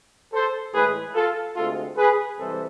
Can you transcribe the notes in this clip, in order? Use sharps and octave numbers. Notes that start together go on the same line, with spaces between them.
A4 C5
A2 E3 G#3 G#4 B4
F4 A4
D2 C3 G#3 F4 A4
G#4 B4
C2 C3 E3 G#3 A4 C5